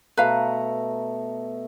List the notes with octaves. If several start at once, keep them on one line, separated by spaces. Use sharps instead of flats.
B2 A3 B4 F5 A#5